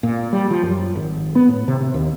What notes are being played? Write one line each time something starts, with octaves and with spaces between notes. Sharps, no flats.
A#2
G3
F3
F#2
G#1
B3
A2
C3
C3
D#2